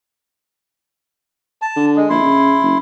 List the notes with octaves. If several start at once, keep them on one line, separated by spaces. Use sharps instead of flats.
A5
D3
G#3
A#1 E4 C6
C#3
F#1